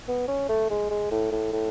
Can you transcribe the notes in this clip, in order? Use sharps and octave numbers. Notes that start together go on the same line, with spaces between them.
B3
C#4
A3
G#3
G#3
A2
A2
A2